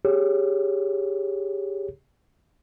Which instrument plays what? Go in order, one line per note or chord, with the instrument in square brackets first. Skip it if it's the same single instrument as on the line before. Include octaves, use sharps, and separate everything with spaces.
[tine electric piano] G4 G#4 C#5